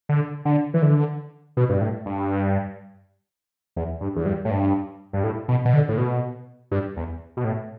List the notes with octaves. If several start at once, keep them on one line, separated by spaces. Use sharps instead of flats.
D3
D3
E3
D3
B2
G2
A2
G2
E2
G2
E2
G2
A2
G2
G2
A2
B2
B2
D3
A2
B2
G2
E2
B2
A2